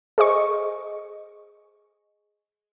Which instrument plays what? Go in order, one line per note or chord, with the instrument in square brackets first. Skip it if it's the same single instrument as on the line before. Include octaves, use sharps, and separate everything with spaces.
[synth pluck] G#4 C5 D#5 C#6